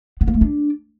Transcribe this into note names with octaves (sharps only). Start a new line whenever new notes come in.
B3
A#3
A3
D4